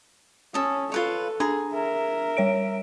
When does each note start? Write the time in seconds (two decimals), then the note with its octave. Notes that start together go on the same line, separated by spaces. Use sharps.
0.54 C#4 A4 D#6
0.92 F4 A4 B4 C#5
1.40 D4 G#4 A#5
1.73 A#4 E5
2.37 G3 C#5 D7